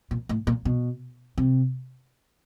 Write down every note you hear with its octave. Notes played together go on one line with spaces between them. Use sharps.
A#2
A2
A#2
B2
C3